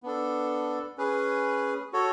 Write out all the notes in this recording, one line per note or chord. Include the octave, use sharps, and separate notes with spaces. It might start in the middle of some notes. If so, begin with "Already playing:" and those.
B3 D4 A4
C#4 G#4 B4
F#4 A4 C#5